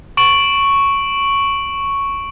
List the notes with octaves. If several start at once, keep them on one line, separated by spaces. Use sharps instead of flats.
C#6 D7 F#7